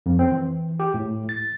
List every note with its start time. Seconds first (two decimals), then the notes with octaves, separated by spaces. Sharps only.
0.06 F2
0.19 C4
0.31 E3
0.80 G4
0.94 A2
1.29 A6